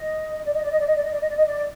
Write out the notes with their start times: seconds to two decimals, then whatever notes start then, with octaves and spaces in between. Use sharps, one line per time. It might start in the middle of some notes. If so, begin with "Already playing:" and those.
Already playing: D#5
0.45 D5
0.54 D#5
0.62 D5
0.70 D#5
0.79 D5
0.87 D#5
0.95 D5
1.04 D#5
1.12 D5
1.21 D#5
1.29 D5
1.37 D#5
1.45 D5